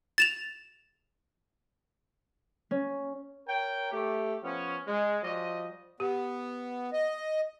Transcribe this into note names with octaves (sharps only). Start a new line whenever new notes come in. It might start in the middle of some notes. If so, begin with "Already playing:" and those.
A6 E7 F7
C#4
A#4 C#5 G5
A3 G4
F3 B3 C#4
G#3
F3 G3 F#4 D#5
B3 G4
D#5